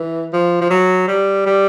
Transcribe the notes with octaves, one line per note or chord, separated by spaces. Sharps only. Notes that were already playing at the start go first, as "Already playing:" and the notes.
Already playing: E3
F3
F3
F#3
G3
G3